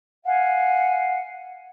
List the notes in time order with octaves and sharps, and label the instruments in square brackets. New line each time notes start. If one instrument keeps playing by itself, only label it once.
[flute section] F5 F#5 G#5